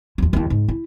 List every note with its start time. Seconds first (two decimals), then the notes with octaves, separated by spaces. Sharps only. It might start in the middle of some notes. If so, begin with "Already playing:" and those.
0.18 D#2 F3
0.33 D#2 E4
0.50 G#2
0.68 E4